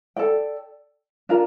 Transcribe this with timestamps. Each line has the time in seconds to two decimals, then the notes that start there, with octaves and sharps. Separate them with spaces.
0.16 A4 D5 G5
1.29 D4 F4 A#4